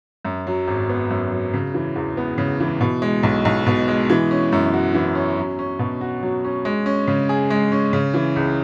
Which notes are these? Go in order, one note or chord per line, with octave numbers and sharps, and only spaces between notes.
F#2
F#3
G#1
B3
F#2
F#3
C#3
E3
E2
B3
C#3
E3
B2
G#3
B1
B1
B2
G#3
E3
C#4
F#2
F#4
E3
C#4
F#3
C#4
B2
F#4
F#3
C#4
G#3
C#4
C#3
G#4
G#3
C#4
C#3
E3
C#2